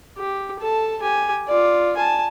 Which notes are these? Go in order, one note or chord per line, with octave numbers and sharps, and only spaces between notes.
G4
A4 A5
G4 G#5
F4 D5
G#5 A5